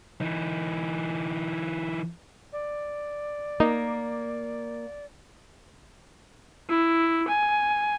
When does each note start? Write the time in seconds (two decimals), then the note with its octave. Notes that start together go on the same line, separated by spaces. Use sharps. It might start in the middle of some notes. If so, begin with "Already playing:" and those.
0.21 E3 D#4
2.53 D5
3.60 A#3 D#4
6.69 E4
7.28 G#5